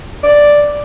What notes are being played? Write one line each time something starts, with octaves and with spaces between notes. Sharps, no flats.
D5